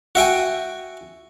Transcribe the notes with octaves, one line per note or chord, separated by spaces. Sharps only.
F#4 E5 G5 G#5